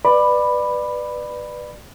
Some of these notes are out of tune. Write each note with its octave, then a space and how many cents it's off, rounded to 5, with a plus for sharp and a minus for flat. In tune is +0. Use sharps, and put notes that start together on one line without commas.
B4 +0 D5 +20 B5 +0